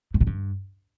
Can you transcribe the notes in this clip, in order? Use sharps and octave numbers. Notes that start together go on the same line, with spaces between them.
A2
B2
G2